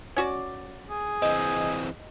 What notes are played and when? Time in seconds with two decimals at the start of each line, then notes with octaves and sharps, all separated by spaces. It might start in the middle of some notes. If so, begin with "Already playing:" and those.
0.16 C#4 F#4 D5
0.90 G#4
1.22 E3 C4 D#5